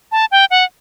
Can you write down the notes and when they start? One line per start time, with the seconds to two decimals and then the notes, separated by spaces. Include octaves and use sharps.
0.12 A5
0.32 G5
0.51 F#5